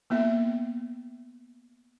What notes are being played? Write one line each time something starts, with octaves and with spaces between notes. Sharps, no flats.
A#3 B3 E5